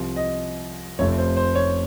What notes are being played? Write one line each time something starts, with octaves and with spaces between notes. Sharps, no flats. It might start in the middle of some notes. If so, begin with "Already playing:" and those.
Already playing: C2 C3 F3
D#5
F1 F2 C3 F3 A3 C#5
C5
C5
C#5